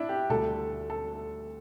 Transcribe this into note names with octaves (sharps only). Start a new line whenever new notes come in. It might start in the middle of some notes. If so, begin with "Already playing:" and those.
Already playing: D4 E4
G4
D2 D3 G3 A4
A4